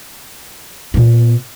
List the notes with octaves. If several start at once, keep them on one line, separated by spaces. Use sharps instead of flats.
A#2 B3